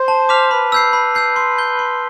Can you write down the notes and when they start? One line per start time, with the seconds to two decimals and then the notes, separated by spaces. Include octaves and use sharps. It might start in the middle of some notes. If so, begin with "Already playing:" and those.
Already playing: C5
0.08 A5
0.29 D6 F6 B6 F7
0.51 B4 B5
0.72 E6 G6 C7
0.93 B5
1.15 E6 G6 C7
1.36 C6
1.58 G6 C7 G7
1.79 C6